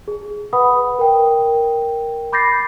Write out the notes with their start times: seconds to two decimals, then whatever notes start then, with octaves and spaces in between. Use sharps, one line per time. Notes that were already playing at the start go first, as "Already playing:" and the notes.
0.08 G#4
0.53 B4 F#5 B5 D#6
0.99 A#4 G5
2.32 B5 D6 G6 A6 A#6 C7